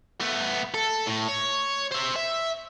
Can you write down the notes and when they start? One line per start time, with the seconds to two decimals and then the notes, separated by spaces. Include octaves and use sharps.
0.21 A3 B3
0.74 A4
1.07 A2
1.28 C#5
1.91 C5 E5
2.16 E5